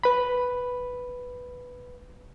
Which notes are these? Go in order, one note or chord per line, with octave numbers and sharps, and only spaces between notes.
B4 B5